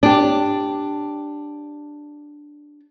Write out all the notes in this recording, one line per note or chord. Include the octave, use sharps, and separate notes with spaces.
D4 G4